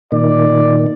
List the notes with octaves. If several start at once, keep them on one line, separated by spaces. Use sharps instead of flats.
A#2 D#3 D5